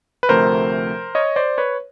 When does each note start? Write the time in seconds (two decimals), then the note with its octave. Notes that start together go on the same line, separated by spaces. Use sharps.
0.23 B4
0.29 D2 C3 F3 A3 A#4 C5
1.15 C#5 D#5
1.36 C5 D5
1.58 B4 C#5